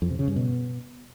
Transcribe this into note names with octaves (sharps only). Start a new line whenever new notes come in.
F2
C3
C#3
G2
B2